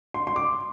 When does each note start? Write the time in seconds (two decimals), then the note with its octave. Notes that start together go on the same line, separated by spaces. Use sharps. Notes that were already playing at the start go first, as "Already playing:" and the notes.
0.14 C6
0.27 C6
0.36 D6